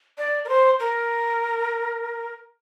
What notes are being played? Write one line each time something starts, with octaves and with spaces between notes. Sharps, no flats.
D5
A#4
C5
A#4